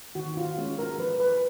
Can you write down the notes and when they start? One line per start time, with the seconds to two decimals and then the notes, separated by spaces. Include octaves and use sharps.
0.15 D#3 F#4
0.37 F4
0.57 G#3 C#4 F#4
0.79 A#4
0.99 F3 B4
1.20 B4